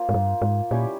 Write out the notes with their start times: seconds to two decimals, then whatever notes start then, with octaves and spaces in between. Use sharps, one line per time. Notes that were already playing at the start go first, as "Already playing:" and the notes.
Already playing: A#3 F4 C5 F5
0.09 G#2
0.14 G2
0.42 G#2
0.71 A#2 G3 C#4 E4 G4